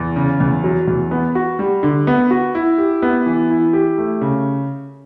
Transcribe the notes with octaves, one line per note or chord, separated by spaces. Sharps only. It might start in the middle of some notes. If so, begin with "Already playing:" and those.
Already playing: E2
C#3
E2
F#3
E2
B3
F#4
G3
D3
B3
F#4
E4
G4
B3
E3
E4
G4
A3
C#3